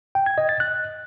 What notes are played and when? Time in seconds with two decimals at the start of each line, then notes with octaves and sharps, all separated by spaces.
0.15 G5
0.26 G#6
0.38 D#5
0.49 A6
0.60 F#6